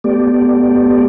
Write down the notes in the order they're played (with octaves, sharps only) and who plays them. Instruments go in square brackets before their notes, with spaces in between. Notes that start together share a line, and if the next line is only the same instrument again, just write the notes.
[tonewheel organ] A3 B3 G4 D5